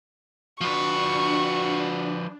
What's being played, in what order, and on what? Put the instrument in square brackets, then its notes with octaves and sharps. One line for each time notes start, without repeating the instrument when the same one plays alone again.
[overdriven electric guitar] F3 B4 [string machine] D4 [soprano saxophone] F#4 [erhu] C#6